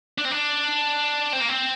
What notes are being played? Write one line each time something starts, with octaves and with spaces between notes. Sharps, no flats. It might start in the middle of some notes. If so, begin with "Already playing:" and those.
D4
C4
D4
C4
A#3
C4